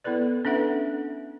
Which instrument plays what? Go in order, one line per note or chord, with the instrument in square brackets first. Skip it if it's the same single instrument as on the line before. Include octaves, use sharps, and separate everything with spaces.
[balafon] B3 E4 A4 B4 D5
C#4 D4 A4 B4 E5 F#5